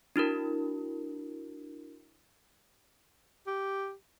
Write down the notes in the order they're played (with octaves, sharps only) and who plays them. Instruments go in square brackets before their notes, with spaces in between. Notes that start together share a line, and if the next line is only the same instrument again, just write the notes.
[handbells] D4 E4 F#4 A#4
[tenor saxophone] G4